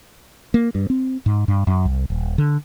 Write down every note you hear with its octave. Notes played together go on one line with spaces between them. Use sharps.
A#3
G2
C4
G#2
G2
F#2
C2
D#1
D3